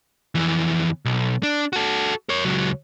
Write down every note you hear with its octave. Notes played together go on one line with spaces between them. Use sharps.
F2 E3
B1
D4
F#4 A4
A#4 C#5
C#2 F#3